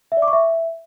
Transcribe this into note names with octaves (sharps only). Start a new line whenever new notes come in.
E5
D5
D6
C#6
E5